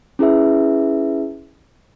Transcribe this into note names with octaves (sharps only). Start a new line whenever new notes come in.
C#4 E4 G#4 B4 E5